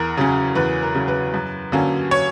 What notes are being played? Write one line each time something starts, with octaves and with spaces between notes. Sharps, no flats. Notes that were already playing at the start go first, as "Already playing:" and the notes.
Already playing: E2 A#4
C#3 F#3 C#4
E2 B4
A#4
C#3 F#3 C#4
B4
F#2
D3 F#3 A#3 C#4
C#5